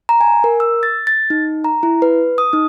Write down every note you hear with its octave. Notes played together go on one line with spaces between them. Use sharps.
A#5
G#5
A#4
E6
A6
A6
D#4
A#5
E4
B4
D#6
D#4